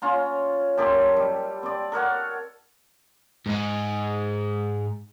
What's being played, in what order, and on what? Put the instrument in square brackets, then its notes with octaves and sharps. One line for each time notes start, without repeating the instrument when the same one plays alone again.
[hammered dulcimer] C#4 F4 A#5
F#2 G4 A4 C6
G3
C4 D5
A4 A#4 C#5 F#5
[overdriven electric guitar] G#2 G#3